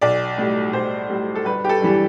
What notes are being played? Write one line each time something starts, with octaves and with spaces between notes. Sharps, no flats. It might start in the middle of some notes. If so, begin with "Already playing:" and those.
B1 D5
A2 G3
B1 C5
A2 G3
A4
G1 B4
G4
A4
G2 E3 G3